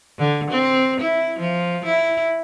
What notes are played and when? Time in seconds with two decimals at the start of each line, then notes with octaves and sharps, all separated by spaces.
0.18 D3
0.50 C4
1.00 E4
1.39 F3
1.85 E4